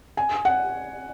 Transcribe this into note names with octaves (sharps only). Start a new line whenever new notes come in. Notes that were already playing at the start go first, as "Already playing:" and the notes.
G#5
F#5